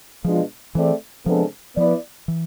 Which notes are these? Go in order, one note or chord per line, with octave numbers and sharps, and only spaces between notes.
B2 F3 G#3 D4 F4
E3 A3 C4 G#4 D5
C3 F3 G#3 B3 D4 A4
F3 B3 E4 B4 D5
E3